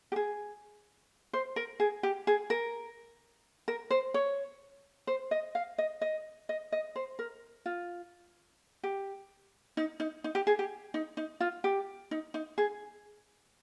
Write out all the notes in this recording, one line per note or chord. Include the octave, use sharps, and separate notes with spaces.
G4
G#4
C5
A#4
G#4
G4
G#4
A#4
A#4
C5
C#5
C5
D#5
F5
D#5
D#5
D#5
D#5
C5
A#4
F4
G4
D#4
D#4
D#4
G4
G#4
G4
D#4
D#4
F4
G4
D#4
D#4
G#4